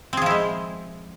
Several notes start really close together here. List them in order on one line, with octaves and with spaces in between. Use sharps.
C4 G#4 F3 E4 G#3